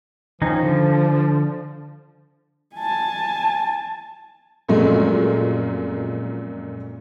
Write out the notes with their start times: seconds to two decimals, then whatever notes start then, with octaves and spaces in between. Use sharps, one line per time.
0.42 D#3 F3 C#4 D#4
0.63 D3
2.75 G#5 A5
4.69 F#2 A#2 F3 G#3 A3 C4